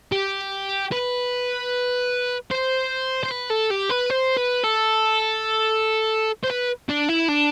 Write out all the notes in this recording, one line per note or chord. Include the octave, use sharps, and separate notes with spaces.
G4
B4
C5
C5
B4
A4
G4
B4
C5
B4
A4
C5
B4
D4
E4
D4